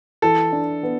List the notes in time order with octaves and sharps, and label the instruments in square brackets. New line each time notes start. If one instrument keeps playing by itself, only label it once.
[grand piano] E3 [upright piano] A4
[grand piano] D4
B3